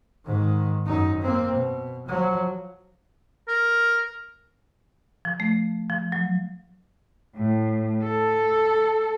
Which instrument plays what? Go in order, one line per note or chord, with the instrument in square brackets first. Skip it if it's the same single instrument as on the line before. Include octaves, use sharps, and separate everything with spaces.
[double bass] G#2 D#3
F#2 D#4
A#3 C4
B2
F3 F#3
[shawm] A#4
[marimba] F3
A3
F3
F#3
[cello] A2
A4